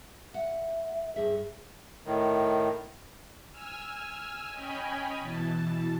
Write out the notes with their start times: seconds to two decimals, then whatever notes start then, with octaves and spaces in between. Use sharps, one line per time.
0.34 E5 F#5
1.16 G2 G#4 E5
2.06 A2 D#3
3.51 G#5 E6 F6
4.50 C#4 C#5 D#5 G5 G#5 B5
5.20 B2 E3 A5